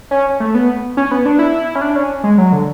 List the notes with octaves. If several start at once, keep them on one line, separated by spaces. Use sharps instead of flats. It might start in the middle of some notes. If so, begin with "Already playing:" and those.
C#4
A3
B3
C#4
B3
D4
E4
C#4
D4
C#4
G#3
F#3
D3